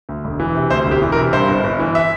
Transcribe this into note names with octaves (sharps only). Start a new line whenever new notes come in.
D2
E1
E3
C3
D2 C5
E1
G4
E3
A#4
C3
G2 C5
G1
G1
E3
E5